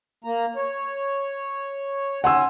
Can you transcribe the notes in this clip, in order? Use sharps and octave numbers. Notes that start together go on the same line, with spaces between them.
A#3 A#5
C#5
C#4 F#5 G#5 C6 E6